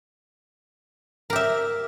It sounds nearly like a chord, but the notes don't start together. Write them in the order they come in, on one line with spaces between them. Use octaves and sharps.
A#4 G4 E5